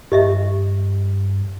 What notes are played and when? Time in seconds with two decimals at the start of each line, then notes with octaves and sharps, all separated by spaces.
0.12 G2 G4 D#5 E5